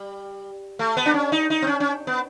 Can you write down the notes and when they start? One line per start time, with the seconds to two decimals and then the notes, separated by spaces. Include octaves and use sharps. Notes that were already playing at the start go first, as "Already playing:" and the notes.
Already playing: G3
0.79 A3
0.97 B3
1.06 D4
1.14 C#4
1.32 D#4
1.50 D#4
1.62 C4
1.67 C#4
1.80 C#4
2.07 B3